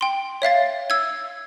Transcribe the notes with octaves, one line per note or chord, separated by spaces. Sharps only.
G5 C6
C#5 E5 F5 A6
E6 G#6